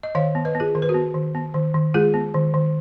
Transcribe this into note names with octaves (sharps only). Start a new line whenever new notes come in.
D#5
D#3 C#5 F5
B3
B4 D#5
B3
F4 G#4
D#3 A#4
B4
F#4 A#4
B3
D#3
B3
D#3
D#3
G#3 F4 G#4
B3
D#3
D#3